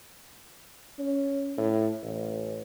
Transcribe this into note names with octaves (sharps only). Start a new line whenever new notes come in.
C#4
A2
A1